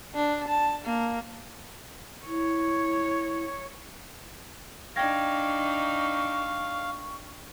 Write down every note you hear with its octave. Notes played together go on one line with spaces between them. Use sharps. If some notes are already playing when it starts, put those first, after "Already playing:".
D4
A5
A#3
E4 C#5
D4 D#4 F5 G5 C#6 G#6 A#6